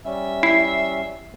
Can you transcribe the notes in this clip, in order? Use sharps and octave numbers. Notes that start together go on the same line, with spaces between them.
G3 C#4 E5
E4 C7